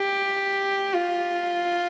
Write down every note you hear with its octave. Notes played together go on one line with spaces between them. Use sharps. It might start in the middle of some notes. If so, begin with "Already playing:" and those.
Already playing: G4
F4